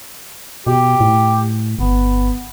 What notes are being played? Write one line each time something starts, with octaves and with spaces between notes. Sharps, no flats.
B2 G4
A2
G1 B3